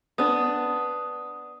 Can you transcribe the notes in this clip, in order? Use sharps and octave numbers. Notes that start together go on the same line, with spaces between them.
B3 D4 D#6